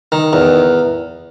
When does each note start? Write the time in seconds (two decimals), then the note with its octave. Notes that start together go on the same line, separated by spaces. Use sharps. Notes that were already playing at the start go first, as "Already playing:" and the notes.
0.12 D#3
0.33 E2